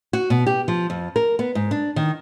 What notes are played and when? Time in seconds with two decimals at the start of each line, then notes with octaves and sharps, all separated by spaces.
0.13 F#4
0.30 B2
0.46 G4
0.68 F3
0.90 F2
1.16 A#4
1.39 B3
1.55 G#2
1.71 D4
1.96 D#3